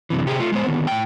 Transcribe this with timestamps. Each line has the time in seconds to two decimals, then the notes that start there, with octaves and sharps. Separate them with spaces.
0.10 F#2 C3 E3
0.26 C3 G4 G#4
0.40 A3 F4
0.52 G#3 B3 C5
0.67 D3 D#3 B3
0.87 A2 G5